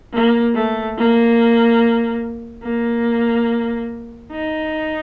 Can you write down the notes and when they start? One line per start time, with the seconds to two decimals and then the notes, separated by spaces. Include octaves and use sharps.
0.13 A#3
0.55 A3
0.97 A#3
2.64 A#3
4.32 D#4